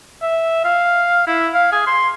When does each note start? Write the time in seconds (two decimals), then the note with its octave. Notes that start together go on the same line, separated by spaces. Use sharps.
0.22 E5
0.65 F5
1.27 E4
1.54 F5
1.72 G#4
1.87 C6